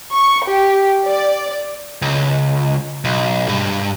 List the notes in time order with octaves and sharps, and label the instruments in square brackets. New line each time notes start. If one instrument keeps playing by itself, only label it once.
[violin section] C#6
G4
D5
[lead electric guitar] C#2
B1
G2